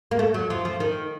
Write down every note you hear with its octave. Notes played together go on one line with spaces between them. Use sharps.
A#3
A3
F#3
F3
F3
D#3